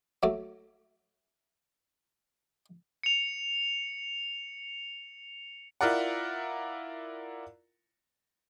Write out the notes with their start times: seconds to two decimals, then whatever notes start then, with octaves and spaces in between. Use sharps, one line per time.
0.23 F#3 A3 D6
3.03 C#7 F7
5.81 E4 F4 A#4 D5 F#5